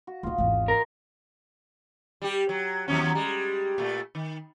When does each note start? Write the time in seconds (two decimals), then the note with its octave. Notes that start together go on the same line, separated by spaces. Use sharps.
0.07 F#4
0.23 D#1 D#2 F4 D#5
0.38 G#1 E2
0.68 A#4
2.22 G3 G4
2.49 F#3
2.88 D#2 F#3 C#4
3.15 G3 G#3
3.78 A#2 A3
4.15 D#3